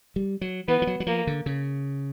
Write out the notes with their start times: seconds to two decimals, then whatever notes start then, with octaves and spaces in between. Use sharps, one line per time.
0.16 G3
0.41 F#3
0.68 E3 B3
0.82 F3
0.87 F#3
1.00 F#3
1.07 F3 A#3
1.27 D3
1.46 C#3